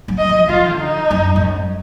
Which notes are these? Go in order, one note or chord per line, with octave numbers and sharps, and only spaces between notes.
F#3
D#5
F3
F3 F4
D#3
D3
D#4
F#2
G#2
F#2